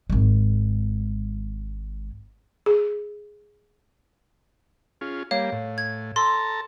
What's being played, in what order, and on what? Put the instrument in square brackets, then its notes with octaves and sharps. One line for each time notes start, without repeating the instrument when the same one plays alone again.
[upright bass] G#1 G#3
[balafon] G#4
[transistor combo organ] C#4 F4 G#4
[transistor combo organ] G3 A#3 [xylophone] C#5 F5
[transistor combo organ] A2
[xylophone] G#6
[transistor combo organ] A4 A5 A#5 [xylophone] C6 E6